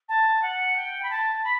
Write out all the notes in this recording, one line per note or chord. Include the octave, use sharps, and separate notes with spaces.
A5
F#5
G5
B5
A5
B5